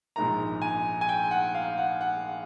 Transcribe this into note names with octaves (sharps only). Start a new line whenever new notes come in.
A#1 G#2 D#3 A#5
G#5
G#5
G5
F#5
F5
F#5
F#5